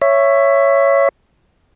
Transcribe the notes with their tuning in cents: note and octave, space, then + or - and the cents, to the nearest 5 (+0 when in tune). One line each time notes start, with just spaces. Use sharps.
C#5 +0 E5 +15